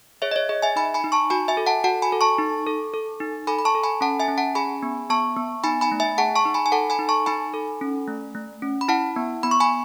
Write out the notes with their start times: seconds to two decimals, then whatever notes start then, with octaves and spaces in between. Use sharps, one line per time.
0.22 G#4 C#5 E5
0.31 D#5
0.36 C#5
0.49 G#4 D#5
0.62 E5 G#5
0.76 D#4 G#5 B5
0.94 G#5 B5
1.04 D#4
1.12 A5 C#6
1.30 F#4 G#5 B5
1.48 E5 G#5
1.57 A4
1.66 F#5 A5
1.84 F#4 F#5 A5
2.02 G#5 B5
2.12 A4
2.21 A5 C#6
2.38 D#4
2.67 A4
2.94 A4
3.20 D#4
3.47 A4 G#5 B5
3.59 B5
3.65 A5 C#6
3.75 A4
3.84 G#5 B5
4.01 C#4 F#5 A5
4.20 E5 G#5
4.28 C#4
4.38 F#5 A5
4.55 G#4 G#5 B5
4.83 B3
5.10 B3 A5 C#6
5.37 B3
5.64 D#4 G#5 B5
5.81 G#5 B5
5.92 A3
6.00 E5 G#5
6.18 G#4 F#5 A5
6.36 A5 C#6
6.45 D#4
6.54 G#5 B5
6.66 G#5
6.72 A4 F#5 A5
6.90 G#5 B5
6.99 D#4
7.09 A5 C#6
7.26 D#4 G#5 B5
7.54 A4
7.81 C#4
8.08 A3
8.35 A3
8.62 C#4
8.81 B5
8.88 E4 F#5 A5
9.16 B3
9.43 B3 B5
9.51 C#6
9.60 G#5 B5